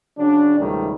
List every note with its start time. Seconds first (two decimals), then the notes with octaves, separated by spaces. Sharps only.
0.18 C#3 F#3 C#4 D4
0.57 C#2 G#2 B2 D#3 G3 A3